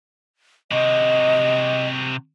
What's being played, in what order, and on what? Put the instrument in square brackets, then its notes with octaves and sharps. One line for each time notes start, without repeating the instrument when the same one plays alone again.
[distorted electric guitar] C3 F#4 [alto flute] D#5